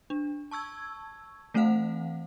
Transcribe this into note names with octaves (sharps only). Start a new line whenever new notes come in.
D4
A5 C#6 E6 G#6
E3 A3 C4 C5 F5 F#5